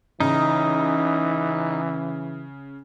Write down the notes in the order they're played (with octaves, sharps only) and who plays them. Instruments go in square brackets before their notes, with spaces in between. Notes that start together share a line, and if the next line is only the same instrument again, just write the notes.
[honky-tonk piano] C#3 [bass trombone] E3 [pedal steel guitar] D#4